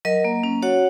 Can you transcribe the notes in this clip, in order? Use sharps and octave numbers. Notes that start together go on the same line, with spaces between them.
F#3 A#4 D#5
A#3
C#4
F#4 C#5 F#5